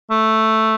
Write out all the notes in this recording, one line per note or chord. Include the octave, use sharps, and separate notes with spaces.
A3